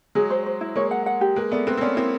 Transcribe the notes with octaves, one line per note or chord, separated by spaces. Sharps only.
F#3 G#3 G#4
C5
C5
E4
G#3 A#3 C#5
F#5
F#5
G4
G#3 A#3 B4
A3 B3 D5
A#3 C4 B4
C4
B3 C#4 D5
A#3 C4 E4